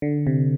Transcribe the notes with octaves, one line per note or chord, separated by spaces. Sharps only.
D3
C3